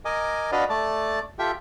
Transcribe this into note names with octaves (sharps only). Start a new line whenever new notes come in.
A#4 D#5 G#5 D6
D4 F#4 B4 D5 D#5 F5
A3 D5 A5
F4 G4 A4 E5 G5